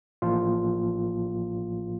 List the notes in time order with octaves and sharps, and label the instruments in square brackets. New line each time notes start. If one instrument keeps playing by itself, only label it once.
[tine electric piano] A1 A2 F3 A#3 F4